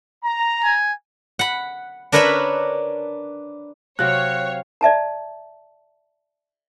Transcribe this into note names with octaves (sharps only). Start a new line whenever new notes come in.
A#5
G#5
F#5 B5
D4 A#4 B4 C#5 E5 B5
C3 F#3 C4 C#5 F5 F#6
D5 E5 A5 A#5